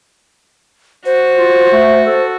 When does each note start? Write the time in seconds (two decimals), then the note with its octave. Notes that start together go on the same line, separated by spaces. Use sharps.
1.06 F#4 C5
1.37 F4
1.72 A3
2.06 A4